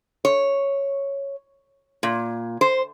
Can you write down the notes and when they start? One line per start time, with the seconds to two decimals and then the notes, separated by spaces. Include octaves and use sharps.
0.25 C#5
2.03 A#2
2.61 C5